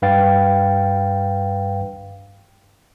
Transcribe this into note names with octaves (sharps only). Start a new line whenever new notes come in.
G2 B4 F5 G5 A6